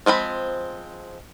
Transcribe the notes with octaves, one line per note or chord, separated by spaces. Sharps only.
F3 G#3 C4 B5